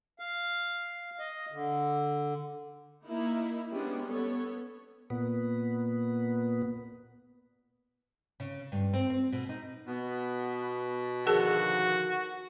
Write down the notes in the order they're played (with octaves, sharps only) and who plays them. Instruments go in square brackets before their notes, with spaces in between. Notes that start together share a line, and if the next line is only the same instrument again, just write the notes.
[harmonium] F5
D#5
D3
[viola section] A#3 D#4 E4
G3 G#3 B3 C#4 D4
B3 A4 C#5
[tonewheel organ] A#2 B3
[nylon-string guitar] C#3
G2
C4
C4
B2
D#4
[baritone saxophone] B2 [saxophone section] B3
[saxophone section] D3 D#3 F3 [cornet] F#4 [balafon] G#4 A#4 A5